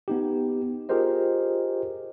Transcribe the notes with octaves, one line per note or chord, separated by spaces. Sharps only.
B3 D#4 G4
F4 G4 G#4 A#4 C5 D#5